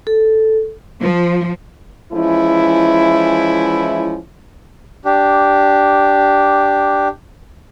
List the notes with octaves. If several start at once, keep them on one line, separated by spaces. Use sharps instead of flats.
A4
F3
E3 F3 G#3 C#4 E4
D4 G4